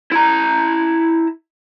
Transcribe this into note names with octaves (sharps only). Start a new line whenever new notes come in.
E4 A#5